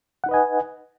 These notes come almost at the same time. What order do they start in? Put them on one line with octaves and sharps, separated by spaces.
F#5 D#4 B4 D#5 G#5